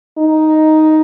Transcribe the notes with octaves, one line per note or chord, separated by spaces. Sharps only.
D#4